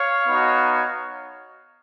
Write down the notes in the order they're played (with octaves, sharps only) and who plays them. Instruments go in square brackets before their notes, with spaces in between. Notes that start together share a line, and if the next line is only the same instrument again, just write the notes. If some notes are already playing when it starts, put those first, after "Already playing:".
Already playing: [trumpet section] C#5 F5
B3 D#4 F#4